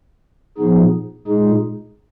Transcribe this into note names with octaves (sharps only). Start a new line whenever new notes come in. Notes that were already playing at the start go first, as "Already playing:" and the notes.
A#2 F3 B3 D#4 G#4
A#2 G#3 D#4 G#4